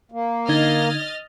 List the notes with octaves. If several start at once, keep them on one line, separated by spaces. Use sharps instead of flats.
A#3
D3 D#4 D#5 F6 G#6 A6